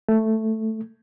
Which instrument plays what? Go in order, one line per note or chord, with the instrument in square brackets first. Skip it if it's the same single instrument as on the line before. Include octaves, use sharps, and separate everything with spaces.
[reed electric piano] A3